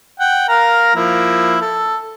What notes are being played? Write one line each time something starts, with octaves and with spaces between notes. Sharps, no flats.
F#5 G5
A#4 F5 A#5
F3 A#3 E4
A4